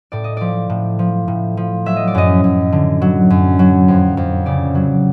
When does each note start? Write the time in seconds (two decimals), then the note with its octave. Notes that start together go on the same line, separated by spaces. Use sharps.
0.12 A2 D5
0.24 D#5
0.37 F3 D5
0.70 A2
0.99 F3
1.28 A2
1.57 F3
1.86 F#3 E5
1.96 D#5
2.07 D5
2.15 F#2 D#5
2.44 F#2
2.72 D3
3.02 F#3
3.30 F#2
3.59 F#3
3.88 F2
4.17 F2
4.46 C#3 D5
4.75 F#3